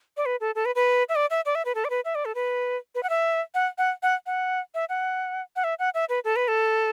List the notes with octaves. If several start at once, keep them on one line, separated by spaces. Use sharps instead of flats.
D5
B4
A4
A4
B4
B4
E5
D5
E5
D5
E5
B4
A4
D5
B4
E5
D5
A4
B4
B4
F#5
E5
F#5
F#5
F#5
F#5
E5
F#5
F#5
E5
F#5
E5
B4
A4
B4
A4